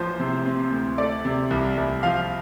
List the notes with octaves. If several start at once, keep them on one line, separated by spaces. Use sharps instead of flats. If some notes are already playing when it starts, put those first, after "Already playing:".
Already playing: A1 F3 C5
C3
C4
D2
A3 D5
C3
C2
C2
F3 F5